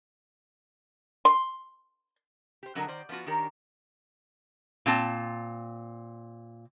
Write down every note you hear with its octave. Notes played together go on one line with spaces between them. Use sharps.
C6
G4 C5
D3 F#3 D4 A#4 D#5
D#3 C5 D5
F3 B3 C#4 F4 F#4
D#3 D4 G4 A#4 C#5
A#2 C4 A5